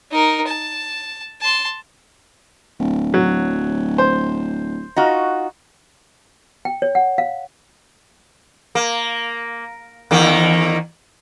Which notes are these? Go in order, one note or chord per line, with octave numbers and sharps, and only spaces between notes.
D#4 A#4
A5
A5 C6
D1
F#3
C5
D#4 F4 F#4
G5
C#5
F#5
F5
A#3
E2 D#3 A#3